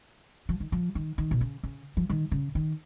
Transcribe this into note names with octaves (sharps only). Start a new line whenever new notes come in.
F3
D#3
F3
D#3
D#3
B2
C#3
C#3
F3
D#3
C#3
D#3